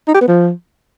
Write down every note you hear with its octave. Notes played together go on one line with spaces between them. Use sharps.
D#4
G4
B3
F3